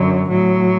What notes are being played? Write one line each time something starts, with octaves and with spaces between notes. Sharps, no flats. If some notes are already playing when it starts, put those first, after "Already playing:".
Already playing: F#2 D3 F#3
A2 F#3